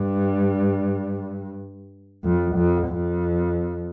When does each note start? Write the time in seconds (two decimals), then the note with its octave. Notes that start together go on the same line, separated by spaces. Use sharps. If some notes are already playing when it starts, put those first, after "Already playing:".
Already playing: G2
2.24 F2
2.55 F2
2.88 F2